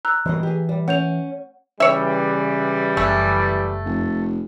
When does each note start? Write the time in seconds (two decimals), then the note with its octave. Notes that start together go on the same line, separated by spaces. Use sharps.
0.05 A#5 E6 F#6
0.26 G2 B2 E3 D#5
0.43 G4 G#4
0.69 G3
0.88 C#4 F#5 G6 F7
1.80 C#3 E3 G3 C#5 E5
2.97 F#1 A3 E5
3.85 F1